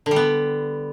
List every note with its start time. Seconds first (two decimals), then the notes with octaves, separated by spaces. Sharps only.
0.06 D3
0.11 G3
0.16 B3